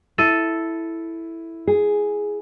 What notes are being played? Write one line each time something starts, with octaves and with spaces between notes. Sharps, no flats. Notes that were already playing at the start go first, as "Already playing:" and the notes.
E4 A4 D#7
G#4